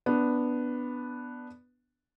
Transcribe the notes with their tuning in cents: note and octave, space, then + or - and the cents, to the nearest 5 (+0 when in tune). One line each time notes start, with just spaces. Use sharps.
B3 +0 D4 +0